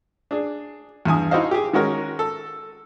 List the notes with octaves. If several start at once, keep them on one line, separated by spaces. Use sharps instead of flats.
D4 G#4
E2 G2 G#5 D#6
D#4 E4 F#4 C5 D#5 F5
G4 G#4
D#3 G#3 C#4 F#4 A#4
A4